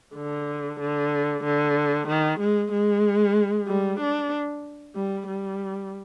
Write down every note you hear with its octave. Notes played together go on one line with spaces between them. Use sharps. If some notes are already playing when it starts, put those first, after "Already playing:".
D3
D3
D3
D#3
G#3
G#3
G3
D4
G3
G3